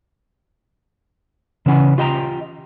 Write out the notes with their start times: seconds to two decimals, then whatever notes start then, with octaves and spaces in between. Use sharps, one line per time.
1.66 C#3 E3 C#4 F#5 G#5
1.98 F4 G4 D#5 G5 A5 A#5